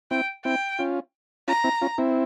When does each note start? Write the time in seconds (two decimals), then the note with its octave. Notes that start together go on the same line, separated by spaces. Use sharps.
0.11 C4 E4 G5
0.45 C4 E4 G5
0.79 C#4 F4
1.48 C#4 F4 A#5
1.64 C4 E4
1.81 C#4 F4
1.98 C4 E4